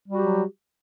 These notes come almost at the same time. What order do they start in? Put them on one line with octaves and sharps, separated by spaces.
G3 F#4 G4 F#3